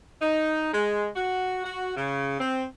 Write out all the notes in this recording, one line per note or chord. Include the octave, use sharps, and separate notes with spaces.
D#4
G#3
F#4
F#4
C#3
C4